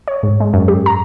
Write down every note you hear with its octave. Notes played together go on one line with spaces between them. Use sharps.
C#5
G#2
G#3
F#2
G4
A#5